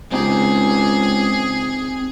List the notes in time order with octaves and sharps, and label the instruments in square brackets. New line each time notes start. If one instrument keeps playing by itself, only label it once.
[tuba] C#2 [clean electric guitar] C4 D#4 G4 [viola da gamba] G#4